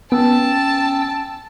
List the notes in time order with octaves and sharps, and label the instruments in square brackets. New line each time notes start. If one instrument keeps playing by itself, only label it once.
[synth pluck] B3 [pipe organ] C#4 G5 E6 [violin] A5